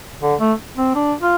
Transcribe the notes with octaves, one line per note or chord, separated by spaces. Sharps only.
D3
A3
C4
D4
F4